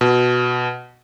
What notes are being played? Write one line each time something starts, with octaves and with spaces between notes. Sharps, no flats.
B2